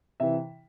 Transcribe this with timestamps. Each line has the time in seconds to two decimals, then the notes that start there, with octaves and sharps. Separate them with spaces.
0.20 C3 E3 E5